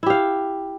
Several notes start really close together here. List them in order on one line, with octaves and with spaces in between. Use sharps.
E4 G4 F5